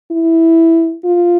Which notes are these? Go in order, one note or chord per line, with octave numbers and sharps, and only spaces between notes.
E4
F4